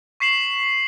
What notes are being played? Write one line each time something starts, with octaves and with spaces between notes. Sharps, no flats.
C#6 B6 C7 E7 F#7